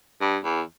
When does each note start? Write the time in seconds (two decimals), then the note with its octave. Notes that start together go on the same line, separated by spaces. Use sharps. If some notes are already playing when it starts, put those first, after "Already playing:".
0.21 G2
0.45 E2